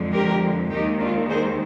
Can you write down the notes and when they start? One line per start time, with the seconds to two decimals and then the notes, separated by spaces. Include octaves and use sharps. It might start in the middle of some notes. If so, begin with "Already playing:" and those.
Already playing: F2 D3 F3 G#3
0.13 G4 A#4
0.70 D#2 D#3 G#3 D#4 G4
1.00 D4 F4
1.29 G#4 C5